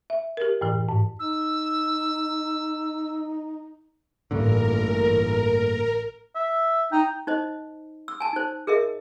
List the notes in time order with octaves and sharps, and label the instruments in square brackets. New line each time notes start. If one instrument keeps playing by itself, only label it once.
[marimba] E5
G4 A#4
F#2 A2 E3
G#2
[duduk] D#4 [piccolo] E6
[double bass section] A1 E3 [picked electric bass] G2 A#2 D3 [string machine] A#4
[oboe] E5
[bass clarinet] D#4 [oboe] G5
[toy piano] D#4 C5 D#5
E6
G#5 A5
D#4 C5
G#4 A#4 D#5 E5